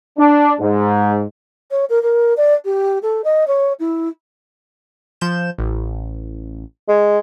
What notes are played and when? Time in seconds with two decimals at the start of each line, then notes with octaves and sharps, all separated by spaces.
0.19 D4
0.60 G#2
1.71 C#5
1.89 A#4
2.02 A#4
2.37 D5
2.65 G4
3.02 A4
3.24 D#5
3.47 C#5
3.79 E4
5.21 F3 G6 E7
5.58 A1
6.89 G#3